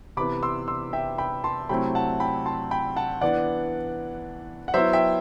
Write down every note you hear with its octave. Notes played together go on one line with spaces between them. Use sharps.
C3 E3 B3 B5 D6
C6 E6
C6 E6
E5 G5
G5 B5
A5 C6
C3 F#3 A3 C4 E4 G5 B5
F#5 A5
G5 B5
A5 C6
G5 B5
F#5 A5
E3 B3 D4 D5 F#5
F#5
F#3 B3 E4 C5 E5
E5 G5